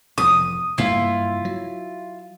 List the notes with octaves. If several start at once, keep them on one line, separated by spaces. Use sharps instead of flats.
F1 E2 A2 D#6
F#1 G2 A#3 E4 F4
F#3